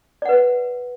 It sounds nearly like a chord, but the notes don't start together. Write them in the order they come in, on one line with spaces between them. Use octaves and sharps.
D5 F#5 B4